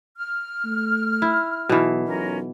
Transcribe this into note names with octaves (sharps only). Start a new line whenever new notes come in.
F6
A3
E4
B1 B2 E3
B1 C#4 F4 A#4